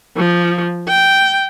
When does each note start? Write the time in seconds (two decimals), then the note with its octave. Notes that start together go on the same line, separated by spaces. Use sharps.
0.17 F3
0.88 G5